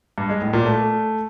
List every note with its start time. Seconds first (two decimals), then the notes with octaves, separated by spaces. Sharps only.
0.18 G2
0.29 G#3
0.41 A2
0.53 A#2
0.65 A3